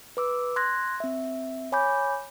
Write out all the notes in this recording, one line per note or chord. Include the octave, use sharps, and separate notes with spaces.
B4 D6 E6
C6 F#6 G#6 A#6
C4 E5
C#5 G#5 B5 D6 G6